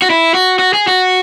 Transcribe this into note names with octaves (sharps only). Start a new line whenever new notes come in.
F#4
E4
F#4
F#4
G#4
F#4